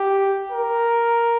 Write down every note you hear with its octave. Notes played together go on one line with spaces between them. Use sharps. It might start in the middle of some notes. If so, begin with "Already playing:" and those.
Already playing: G4
A#4